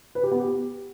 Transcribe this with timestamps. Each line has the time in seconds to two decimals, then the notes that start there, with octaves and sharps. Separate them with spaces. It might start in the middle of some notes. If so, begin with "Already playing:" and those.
0.15 B4
0.23 G4
0.32 B3
0.40 G4